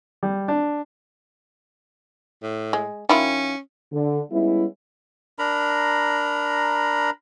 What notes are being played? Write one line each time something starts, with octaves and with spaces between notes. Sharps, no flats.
G3
D4
A2
G#3
D#3 C#4 E4 F4
D3
G3 G#3 B3 C#4 E4
D4 A#4 A#5 B5